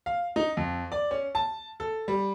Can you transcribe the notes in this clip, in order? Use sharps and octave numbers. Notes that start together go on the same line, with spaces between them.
F5
D#4
F2
D5
C#4
A5
A4
G3